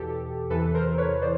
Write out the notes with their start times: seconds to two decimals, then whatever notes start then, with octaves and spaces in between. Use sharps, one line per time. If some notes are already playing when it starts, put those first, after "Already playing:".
Already playing: E2 B2 G4 A4
0.50 E2 C3 E3 A4 B4
0.74 A#4 C5
0.98 B4 C#5
1.22 E3 C5 D5